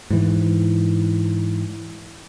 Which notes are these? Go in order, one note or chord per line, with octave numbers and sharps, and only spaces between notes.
G#2 E3